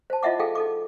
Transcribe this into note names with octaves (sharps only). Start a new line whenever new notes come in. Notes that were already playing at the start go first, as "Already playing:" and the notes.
C5 A5
E4 F4 D#5 E5 F#5 D6
D#4 G#4 A4 F5 G5 D6
D#4 A4 D6